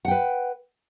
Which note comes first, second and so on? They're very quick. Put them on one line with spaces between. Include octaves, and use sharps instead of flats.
F#5 G5 B4